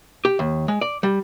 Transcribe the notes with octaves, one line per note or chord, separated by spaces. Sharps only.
G4
D#2
G#3
D5
G3